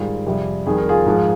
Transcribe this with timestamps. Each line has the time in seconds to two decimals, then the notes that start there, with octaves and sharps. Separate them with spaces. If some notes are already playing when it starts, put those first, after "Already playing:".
Already playing: G#2 D#3 G3 F4 G#4
0.26 F2 C3 G3
0.66 F2 D#3 G3 G#4
0.78 A#4
0.89 F4 G#4
1.06 G#2 F3 G#3